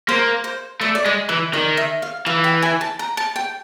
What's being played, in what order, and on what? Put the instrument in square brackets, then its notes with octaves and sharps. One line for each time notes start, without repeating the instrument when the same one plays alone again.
[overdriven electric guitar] A#3 [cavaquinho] C5
[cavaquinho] C5
[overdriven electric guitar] A3 [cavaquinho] D5
[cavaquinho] D5
[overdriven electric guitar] G#3 [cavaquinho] D#5
[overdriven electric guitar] E3 [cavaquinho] E5
[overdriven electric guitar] D#3 [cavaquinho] D5
[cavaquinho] E5
F5
[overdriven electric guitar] E3 [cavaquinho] F5
[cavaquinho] G5
G#5
A5
A#5
A5
G5